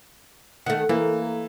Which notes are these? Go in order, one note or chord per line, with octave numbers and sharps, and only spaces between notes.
D#3 A3 F#5
E3 A#3